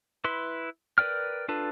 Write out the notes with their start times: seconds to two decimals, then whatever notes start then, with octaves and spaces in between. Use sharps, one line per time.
0.24 E4 B4 C6
0.98 A#4 B4 D5 G5 F6
1.48 D4 F4 A4 B4 A5